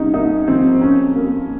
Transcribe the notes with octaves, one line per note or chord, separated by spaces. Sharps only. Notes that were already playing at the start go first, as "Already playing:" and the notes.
Already playing: C2 C3 C#4 D#4
A#3 D#4
F3 C4
F2 C#4
A#3